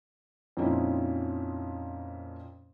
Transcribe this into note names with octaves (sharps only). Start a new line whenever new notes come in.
F2 A#2 C4 C#4 D#4 E4